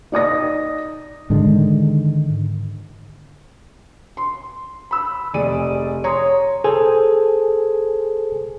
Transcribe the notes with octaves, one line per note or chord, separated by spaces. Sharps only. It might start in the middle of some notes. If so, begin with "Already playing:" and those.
D#4 D5 D#6 A#6
G#2 D3 D#3 G#3
C6
B5 E6
F1 G#4 D5 D#7
C#5 A#5 C6 D#6
G#4 A4 C5 G#5